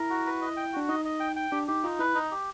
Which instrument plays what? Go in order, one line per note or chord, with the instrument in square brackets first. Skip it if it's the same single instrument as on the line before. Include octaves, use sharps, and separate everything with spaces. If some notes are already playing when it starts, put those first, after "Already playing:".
Already playing: [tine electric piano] E4 [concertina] A#4
[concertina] F#4
B4
D#5
G5
[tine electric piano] D4 [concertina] F#4
[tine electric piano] D#4 [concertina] D#5
[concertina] D#5
G5
G5
[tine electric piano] D4 [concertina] G4
[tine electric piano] D#4 [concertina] G4
[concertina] D#4 [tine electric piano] F4
[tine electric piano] E4 [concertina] B4
[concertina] D#4
G4